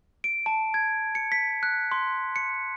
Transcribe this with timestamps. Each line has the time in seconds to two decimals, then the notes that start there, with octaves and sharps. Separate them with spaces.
0.24 D7
0.46 A5
0.74 G#6
1.15 C#7
1.32 B6
1.63 F#6
1.92 C6
2.36 C#7